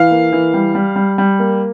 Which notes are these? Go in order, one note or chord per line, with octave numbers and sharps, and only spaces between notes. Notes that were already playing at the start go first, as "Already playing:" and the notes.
Already playing: E3 F5
A#3
E3
G3
G3
G3
G3
A#3